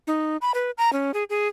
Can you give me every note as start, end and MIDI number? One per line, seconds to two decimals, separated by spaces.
0.07 0.37 63
0.42 0.52 83
0.54 0.71 71
0.78 0.93 82
0.93 1.11 61
1.14 1.24 68
1.30 1.48 68